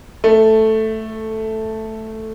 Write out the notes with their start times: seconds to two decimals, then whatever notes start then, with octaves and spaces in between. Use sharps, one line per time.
0.24 A3